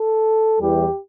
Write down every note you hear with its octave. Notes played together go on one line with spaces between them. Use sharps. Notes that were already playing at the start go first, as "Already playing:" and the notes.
Already playing: A4
E2 E3 G3 G4